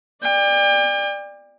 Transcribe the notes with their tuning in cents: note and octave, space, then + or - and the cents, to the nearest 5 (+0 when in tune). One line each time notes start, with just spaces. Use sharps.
D5 +15 G5 +40